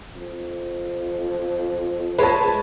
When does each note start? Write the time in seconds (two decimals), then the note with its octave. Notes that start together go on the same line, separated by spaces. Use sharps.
0.16 F2
2.19 G#3 B4 C#5 A5